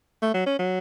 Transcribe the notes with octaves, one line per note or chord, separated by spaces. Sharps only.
A3
F#3
C#4
F#3